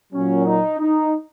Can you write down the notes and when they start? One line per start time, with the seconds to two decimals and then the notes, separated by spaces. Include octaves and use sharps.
0.13 A#2 F#3 C#4
0.46 D#4
0.79 D#4